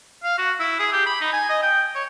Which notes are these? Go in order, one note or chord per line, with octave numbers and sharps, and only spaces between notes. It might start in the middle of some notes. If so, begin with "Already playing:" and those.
F5
F#4
E4
G#4
G4
B5
D#4
G#5
D#5
G5
C#5